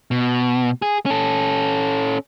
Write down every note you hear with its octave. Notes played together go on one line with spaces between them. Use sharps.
B2
G#4
C#4 A4